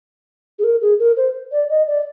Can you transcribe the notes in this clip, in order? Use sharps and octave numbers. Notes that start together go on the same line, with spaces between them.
G#4
A#4
G#4
A#4
C5
D5
D#5
D5